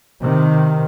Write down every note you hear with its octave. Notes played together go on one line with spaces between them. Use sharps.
C3 D#3